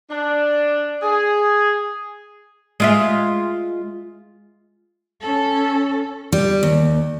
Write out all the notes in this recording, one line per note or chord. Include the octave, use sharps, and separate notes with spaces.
D4
G#4
G#3 F4 E5
C#4 A4
G3
D#2